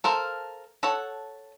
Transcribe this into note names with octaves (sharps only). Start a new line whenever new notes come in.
A4 A#4 C5 F5
A4 C#5 F#5